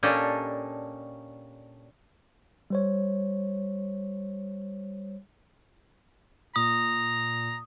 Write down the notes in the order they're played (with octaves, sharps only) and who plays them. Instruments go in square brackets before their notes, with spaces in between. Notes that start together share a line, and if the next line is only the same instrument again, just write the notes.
[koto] A#2 C#4 D4 G4 A4 D#5
[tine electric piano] G3 C5 C#5
[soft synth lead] A#2 [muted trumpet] A#5 [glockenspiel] D#6